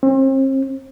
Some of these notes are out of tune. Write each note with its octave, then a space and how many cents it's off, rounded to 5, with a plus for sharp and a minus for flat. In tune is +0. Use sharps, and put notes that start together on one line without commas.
C4 +40